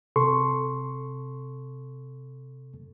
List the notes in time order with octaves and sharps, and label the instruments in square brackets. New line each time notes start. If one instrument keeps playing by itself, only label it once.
[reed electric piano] C3 A4 C6 C#6